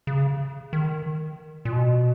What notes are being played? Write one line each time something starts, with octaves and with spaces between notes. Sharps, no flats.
C#3
D#3
A#2
B2